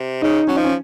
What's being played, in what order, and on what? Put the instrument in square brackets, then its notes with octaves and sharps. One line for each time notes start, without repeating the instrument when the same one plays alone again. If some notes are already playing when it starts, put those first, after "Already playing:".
Already playing: [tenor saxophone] C3
[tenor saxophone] C#3 [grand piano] D#4
[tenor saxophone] F#3 [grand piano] C#4
[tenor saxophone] F3 [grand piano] D#4
[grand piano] C#4